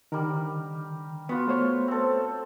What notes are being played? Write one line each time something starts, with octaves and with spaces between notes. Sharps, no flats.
D3 D#3 G3 A#4
B3 F4 F#4 C#6
A3 C5 C#5
C4 A4